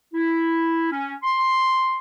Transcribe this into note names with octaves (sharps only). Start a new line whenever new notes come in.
E4
C#4
C6